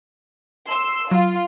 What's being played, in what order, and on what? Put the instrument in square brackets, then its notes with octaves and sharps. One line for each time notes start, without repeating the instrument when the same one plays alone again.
[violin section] C6 E6
[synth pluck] F#3 [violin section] F4